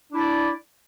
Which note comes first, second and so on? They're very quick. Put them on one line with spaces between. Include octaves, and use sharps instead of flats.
D4 E4 D5